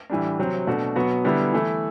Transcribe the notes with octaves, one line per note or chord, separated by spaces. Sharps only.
A2 E3 G3 D4
C3 F#3 C4
B2 A3 D4 F#4
B2 F#3 B3 F#4
D3 G3 B3 E4
E3 A3 E4